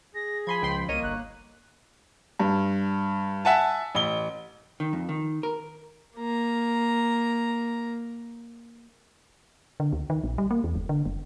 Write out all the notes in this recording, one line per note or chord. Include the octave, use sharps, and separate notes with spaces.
G#4 A#6
F3 G#5 B5 C6 G#6
C#2 G5 C6
C2 A#3 A#4 C#5 D#5 D#7
G1 F#6
G2
E5 F#5 G#5 A5
A1 G7
D#3
F2
D#3
A#4
A#3 A#5
D3
D2
D#3
A#1
G3
A#3
E2
F#1
D3
F#1